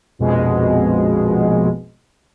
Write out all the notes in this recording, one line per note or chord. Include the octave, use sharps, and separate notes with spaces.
A#1 F2 B2 G#3